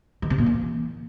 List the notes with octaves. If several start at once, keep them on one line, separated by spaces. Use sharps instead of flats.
D#3
C3
A#2
E3